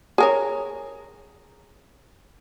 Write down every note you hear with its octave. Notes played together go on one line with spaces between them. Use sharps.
G#4 A#4 C#5